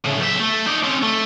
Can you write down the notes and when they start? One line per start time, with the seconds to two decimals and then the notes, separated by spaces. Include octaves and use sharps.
0.05 A2 C#3
0.19 B1 E5
0.40 A3
0.66 D#4 D5
0.83 C4 C#4
1.02 A3